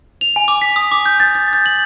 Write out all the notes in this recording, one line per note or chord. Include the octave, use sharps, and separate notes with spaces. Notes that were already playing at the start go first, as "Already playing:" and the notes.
F7
G#5
D6
B6
D#6
D6
G6
A6
A6
G6
F#7